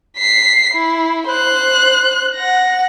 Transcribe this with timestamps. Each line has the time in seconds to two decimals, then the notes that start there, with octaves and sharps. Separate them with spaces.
0.18 B6 C7
0.74 E4
1.28 C5 F#6
2.36 F#5 A#6